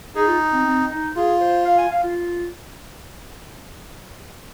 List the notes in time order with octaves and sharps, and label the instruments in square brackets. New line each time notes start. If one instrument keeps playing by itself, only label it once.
[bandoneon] D#4 [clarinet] G#4
[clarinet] F4
C4
C4
D#4
[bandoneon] F4 [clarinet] G#4
[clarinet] C5
F5
G#5
F5
F4